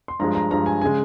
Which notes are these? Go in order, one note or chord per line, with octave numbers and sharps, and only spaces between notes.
C6
G2 F3 G#3 A#5
A#5
G2 F3 G#3 A#5
G#5
C#3 G#3 G#5